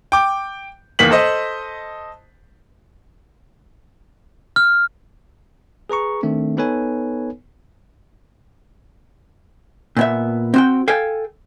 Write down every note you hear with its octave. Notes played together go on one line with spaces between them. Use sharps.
G5 D6
E2 D#3 A#3 B6 F#7
A4 C5 D#5
F6
G#4 B4 A#5 C#6
D#3 A3 C4 D4
B3 D#4 A4 B4 C#5 G#5
A#2 B3 E5
C4 F#4 G5
A4 F5 G5 G#5